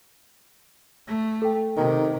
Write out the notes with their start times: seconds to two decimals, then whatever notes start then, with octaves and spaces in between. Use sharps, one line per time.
1.07 A3
1.42 A4 G5
1.77 C3 D#3